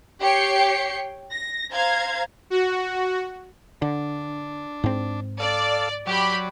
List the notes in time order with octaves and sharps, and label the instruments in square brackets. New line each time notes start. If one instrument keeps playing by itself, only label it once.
[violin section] G4 C#5 G5 G6 C7 C#7
A#6
C5 F5 A#5 G#6
[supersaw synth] F#4
[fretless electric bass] D3 [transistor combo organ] D4
[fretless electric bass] G#2 C4
[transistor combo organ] A4 F5 [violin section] D5
[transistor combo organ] F#3 D5 [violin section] G4 B5